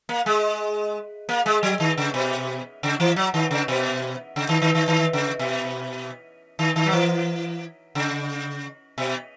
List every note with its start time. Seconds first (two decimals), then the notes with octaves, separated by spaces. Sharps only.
0.09 A#3
0.26 G#3
1.29 A#3
1.46 G#3
1.63 F#3
1.80 D#3
1.97 C#3
2.14 B2
2.83 C#3
3.00 E3
3.16 F#3
3.34 D#3
3.51 C#3
3.68 B2
4.36 C#3
4.49 D#3
4.62 D#3
4.75 D#3
4.88 D#3
5.13 C#3
5.39 B2
6.59 D#3
6.76 D#3
6.86 F#3
6.93 E3
7.95 C#3
8.98 B2